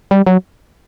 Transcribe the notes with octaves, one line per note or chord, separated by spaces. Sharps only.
G3
F#3